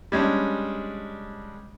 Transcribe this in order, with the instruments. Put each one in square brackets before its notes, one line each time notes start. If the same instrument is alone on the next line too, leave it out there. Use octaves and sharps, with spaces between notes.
[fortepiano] G3 G#3 C#4 D4